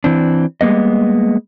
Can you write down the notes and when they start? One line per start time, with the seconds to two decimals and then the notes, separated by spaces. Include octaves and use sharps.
0.04 E3 C4 D4
0.61 G3 G#3 A#3 B3 D#5